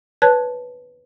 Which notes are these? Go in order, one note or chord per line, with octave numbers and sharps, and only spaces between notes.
B4 C#5 A5 F#6 G#6